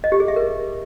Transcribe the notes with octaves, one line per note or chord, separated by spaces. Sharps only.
D#5
G4
G#4
E5
A#4